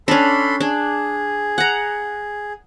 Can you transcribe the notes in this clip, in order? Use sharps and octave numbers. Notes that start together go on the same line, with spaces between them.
C#4 D4 A4 B5 C6
D4 G#4
F#5 A#5